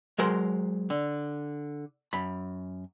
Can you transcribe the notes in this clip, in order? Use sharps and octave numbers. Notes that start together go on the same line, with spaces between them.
F#3 G#3 A#4 C5
D3
F#2 B5